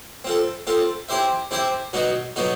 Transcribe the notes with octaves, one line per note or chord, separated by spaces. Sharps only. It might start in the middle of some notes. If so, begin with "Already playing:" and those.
C4 F4 A4
C4 F4 A4
C4 E4 G4 C5 E5
C4 E4 G4 C5 E5
B2 F#3 B3 D#4 F#4
B2 F#3 B3 D#4 F#4